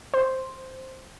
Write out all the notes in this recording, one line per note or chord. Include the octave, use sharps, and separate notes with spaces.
C5